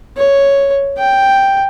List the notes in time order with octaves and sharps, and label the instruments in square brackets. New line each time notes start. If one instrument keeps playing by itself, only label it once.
[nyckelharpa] C#5
G5